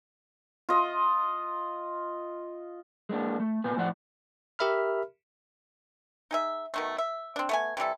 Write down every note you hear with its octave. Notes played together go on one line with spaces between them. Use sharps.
F4 D#5
G#3 A#3 D4
A3
A#2 B3 B4 G#5
F2 A2 F3 C5 D5 F#5
G4 A#4 E5 B5 F6
D#4 G#4 E5
B2 D#3 A3
E5
C4 D4
A3 B3 G#5
C3 E3 G3 A4